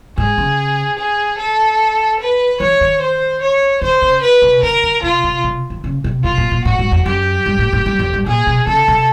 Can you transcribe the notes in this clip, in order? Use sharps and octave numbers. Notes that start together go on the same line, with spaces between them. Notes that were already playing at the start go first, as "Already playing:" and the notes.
G#2 G#4
C#3
G#4
A4
B4
E3 C#5
D#3
C5
C#5
D3 C5
C#3
B4
C3
C#3 A#4
D3
C3 F4
C3
C3
D#3
C#3
C3
C3 F4
A#2
A#2
A2 F#4
G#2
F2
F#2 G4
G2
A2
A2
G2
F2
G2
A#2 G#4
B2
C#3 A4
C3